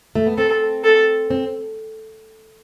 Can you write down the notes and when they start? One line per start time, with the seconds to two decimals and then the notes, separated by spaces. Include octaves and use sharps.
0.15 A3
0.26 B3
0.38 C4 A4
0.84 A4
1.30 C4